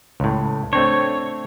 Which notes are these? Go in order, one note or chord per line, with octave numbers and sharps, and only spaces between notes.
C#2 A2
A3 C4 D4 C#5